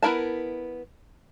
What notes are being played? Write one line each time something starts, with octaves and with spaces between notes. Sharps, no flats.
B3 E4 A#4 E5 A5